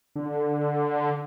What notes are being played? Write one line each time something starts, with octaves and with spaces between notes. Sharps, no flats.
D3